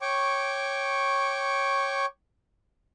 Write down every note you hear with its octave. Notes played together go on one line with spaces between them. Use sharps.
C#5 G5 C#6 D6